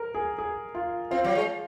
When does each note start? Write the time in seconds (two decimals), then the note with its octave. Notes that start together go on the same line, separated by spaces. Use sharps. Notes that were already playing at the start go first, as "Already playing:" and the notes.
Already playing: A#4
0.15 G#4
0.38 G#4
0.75 F4
1.11 C4 F4
1.24 F#3
1.35 G#3